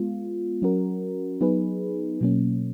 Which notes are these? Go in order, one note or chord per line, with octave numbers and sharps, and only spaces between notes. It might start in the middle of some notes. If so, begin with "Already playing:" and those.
Already playing: G#3 B3 F4
F#3 C#4 F#4 A#4
F#3 B3 D#4 G#4 B4
B2 F#3 A#3 C#4